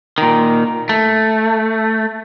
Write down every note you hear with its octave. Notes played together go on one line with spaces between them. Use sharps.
A#2 D#3
A3